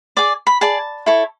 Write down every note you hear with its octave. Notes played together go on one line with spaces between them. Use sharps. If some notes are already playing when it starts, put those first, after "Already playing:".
G#4 D5 D6
B5
G#4 D5 A5
E4 A4 C#5